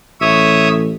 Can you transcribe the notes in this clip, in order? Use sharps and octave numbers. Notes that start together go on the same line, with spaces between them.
A1 C#5 E5 D#6